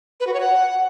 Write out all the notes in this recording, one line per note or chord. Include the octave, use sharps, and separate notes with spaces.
B4
F#4
C#5
F#5